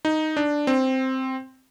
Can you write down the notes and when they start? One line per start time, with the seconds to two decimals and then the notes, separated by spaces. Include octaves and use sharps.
0.05 D#4
0.37 D4
0.67 C4